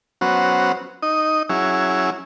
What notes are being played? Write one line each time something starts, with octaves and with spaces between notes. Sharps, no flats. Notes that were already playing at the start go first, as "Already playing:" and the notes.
F#3 B3 C#4 F#4 C5
D#4 D#5
F#3 C#4 E4 G#4